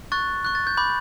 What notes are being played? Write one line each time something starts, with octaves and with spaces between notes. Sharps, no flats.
C#6 F#6 A6
C#6 F#6
A6
G6
B5 D6 G6